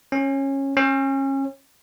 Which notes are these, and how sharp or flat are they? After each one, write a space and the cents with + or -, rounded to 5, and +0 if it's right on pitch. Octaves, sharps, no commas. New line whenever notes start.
C#4 -20
C#4 -30